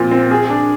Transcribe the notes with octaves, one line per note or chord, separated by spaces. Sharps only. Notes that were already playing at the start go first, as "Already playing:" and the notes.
Already playing: A#2 F3 C4 F4
C4
G#4
D4